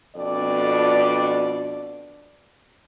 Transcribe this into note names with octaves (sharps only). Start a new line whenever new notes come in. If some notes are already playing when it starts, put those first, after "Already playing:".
F2 B2 D4 D5